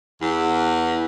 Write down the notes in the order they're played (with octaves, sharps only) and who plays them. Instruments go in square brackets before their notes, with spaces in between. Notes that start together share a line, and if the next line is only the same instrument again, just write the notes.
[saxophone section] E2